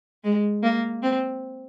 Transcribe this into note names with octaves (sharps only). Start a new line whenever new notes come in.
G#3
A#3
C4